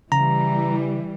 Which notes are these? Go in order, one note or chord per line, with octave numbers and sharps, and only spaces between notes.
C#3 E3 G3 A#5